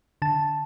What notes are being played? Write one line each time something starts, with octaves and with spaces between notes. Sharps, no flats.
D3 A5